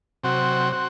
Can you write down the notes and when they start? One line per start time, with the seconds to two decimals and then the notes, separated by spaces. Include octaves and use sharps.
0.23 C3 F#3 C4 F#4
0.73 C4 F#4